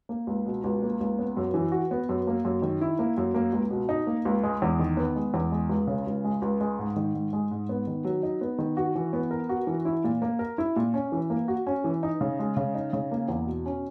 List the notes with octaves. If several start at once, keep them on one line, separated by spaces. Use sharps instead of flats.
A#3
C#2
B2
C#2
A#3
C#2
B3
F#2
E3
F#4
B3
F#2
A#3
F#2
D#3
E4
A#3
F#2
A#3
C#2
B2
D#4
A#3
C#2
G#3
E2
D#3
B3
G#3
E2
G#3
C#2
C#3
C#2
G#3
C#2
G#3
G#2
D#3
G#2
G#3
G#2
B3
D#3
F#3
D#4
B3
D#3
F#4
E3
B3
A#4
F#4
E3
E4
A#2
A#3
A#4
E4
A#2
C#4
E3
A#3
F#4
C#4
E3
D#4
C#3
G#3
C#3
D#4
C#3
A#3
E2
B2
C#4